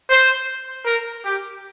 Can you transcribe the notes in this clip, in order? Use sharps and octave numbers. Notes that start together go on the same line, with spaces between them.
C5
A#4
G4